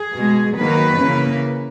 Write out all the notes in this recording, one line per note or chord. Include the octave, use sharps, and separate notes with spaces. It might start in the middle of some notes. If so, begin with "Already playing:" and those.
Already playing: G#4
B2 G#3
D#3 F#3 A#3 B4
C#3 E3 A#3